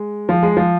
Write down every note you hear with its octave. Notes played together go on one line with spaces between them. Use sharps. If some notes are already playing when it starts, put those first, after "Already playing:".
Already playing: G#3
F3
G#3
F3